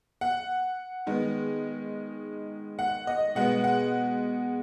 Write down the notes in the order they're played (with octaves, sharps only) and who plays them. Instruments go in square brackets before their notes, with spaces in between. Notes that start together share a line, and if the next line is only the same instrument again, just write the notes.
[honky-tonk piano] F#5
D#3 G#3 B3
F#5
D#5
B2 G#3 B3 F#5
F#5